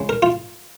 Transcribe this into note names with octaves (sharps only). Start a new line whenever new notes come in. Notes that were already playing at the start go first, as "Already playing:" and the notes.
Already playing: C#2 C#3 G#3
A#4
F4